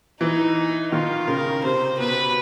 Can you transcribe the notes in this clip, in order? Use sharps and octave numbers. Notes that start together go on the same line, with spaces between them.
E3 D#4
D#3 F4
C#3 A#4
C3 C5
B2 B4